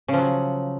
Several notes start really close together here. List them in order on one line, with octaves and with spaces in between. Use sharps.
C#3 F3 F#3